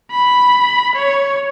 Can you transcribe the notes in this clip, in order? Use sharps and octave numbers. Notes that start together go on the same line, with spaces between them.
B5
C#5